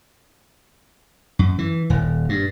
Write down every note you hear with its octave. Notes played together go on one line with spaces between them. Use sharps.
F#2
E3
D#1
G2